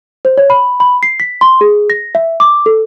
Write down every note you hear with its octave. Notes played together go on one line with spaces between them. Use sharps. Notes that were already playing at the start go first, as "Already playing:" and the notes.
C5
C#5
B5
B5
C7
B6
C6
G#4
A#6
E5
D6
A4